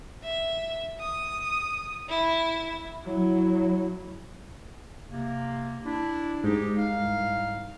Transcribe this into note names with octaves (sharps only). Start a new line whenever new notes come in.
E5
D#6
E4
F#3 E4
C3 A#3
D4 E4
G#2 D#4 G4
C2 D#4 F5